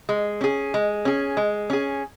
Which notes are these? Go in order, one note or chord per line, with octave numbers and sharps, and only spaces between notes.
G#3
C#4 G#4
G#3
C#4 G#4
G#3
C#4 G#4